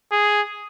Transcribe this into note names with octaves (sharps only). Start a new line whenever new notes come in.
G#4